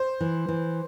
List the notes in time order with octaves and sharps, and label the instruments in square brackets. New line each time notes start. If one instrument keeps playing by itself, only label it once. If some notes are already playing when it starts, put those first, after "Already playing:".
Already playing: [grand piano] C5
[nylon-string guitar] E3
E3